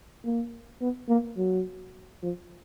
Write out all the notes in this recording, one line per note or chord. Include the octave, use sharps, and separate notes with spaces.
A#3
B3
A#3
F#3
F3